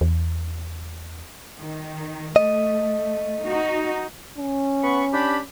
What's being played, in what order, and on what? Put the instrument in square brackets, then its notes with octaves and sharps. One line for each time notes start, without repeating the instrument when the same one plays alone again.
[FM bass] E2
[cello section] D#3
[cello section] A3 [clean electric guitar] D#5
[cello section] D#4 F#4
[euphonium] C#4
[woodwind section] B3 B5 C#6
D4 G4 B5